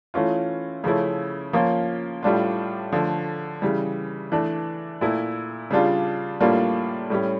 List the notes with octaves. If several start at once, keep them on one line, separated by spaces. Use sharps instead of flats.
E3 A3 C#4 F4
C#3 F3 A3 C#4 E4
F3 A#3 C#4 F4
A2 G3 D4 F4
D3 F3 A3
C#3 E3 G3
E3 A3 D4
A#2 A3 E4
C#3 G3 D4 F4
A2 G3 A#3 D4 F4
A2 G3 C#4